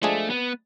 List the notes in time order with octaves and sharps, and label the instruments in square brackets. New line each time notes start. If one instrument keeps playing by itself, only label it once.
[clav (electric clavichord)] F3 G#3 D4 G#4 [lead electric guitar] A3
[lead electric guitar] B3